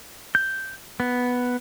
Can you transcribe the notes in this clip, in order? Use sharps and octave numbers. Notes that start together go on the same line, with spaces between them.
G6
B3